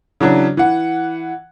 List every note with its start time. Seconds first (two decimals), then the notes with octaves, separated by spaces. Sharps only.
0.20 C#3 E3 F#3 D4
0.57 E3 F#5